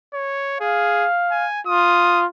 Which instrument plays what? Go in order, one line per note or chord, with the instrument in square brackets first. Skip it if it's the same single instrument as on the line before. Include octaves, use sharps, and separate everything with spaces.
[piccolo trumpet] C#5
[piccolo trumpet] G#4 [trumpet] F5
[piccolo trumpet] G#5
[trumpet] F4 [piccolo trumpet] D#6